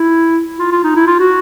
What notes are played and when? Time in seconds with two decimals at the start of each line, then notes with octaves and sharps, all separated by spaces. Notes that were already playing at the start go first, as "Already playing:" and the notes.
Already playing: E4
0.59 F4
0.71 F4
0.84 D#4
0.96 E4
1.07 F4
1.19 F#4